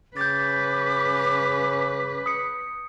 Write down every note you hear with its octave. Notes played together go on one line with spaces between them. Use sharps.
C#3 B4 D6 G6 A6
D#6 C#7